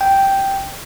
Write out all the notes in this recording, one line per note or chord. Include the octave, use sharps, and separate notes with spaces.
G5